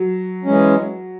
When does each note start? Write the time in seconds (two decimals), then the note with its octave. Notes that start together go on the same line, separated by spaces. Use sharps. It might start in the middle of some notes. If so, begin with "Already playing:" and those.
Already playing: F#3
0.44 E3 G#3 C#4